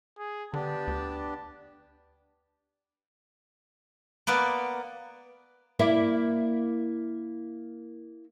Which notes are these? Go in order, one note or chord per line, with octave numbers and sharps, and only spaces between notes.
G#4
D3 B3 D4 G4 A5
D2
A#3 B3 B4 D5
A#3 E4 D5